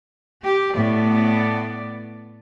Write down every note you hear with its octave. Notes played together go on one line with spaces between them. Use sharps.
G4
A2 B3 D5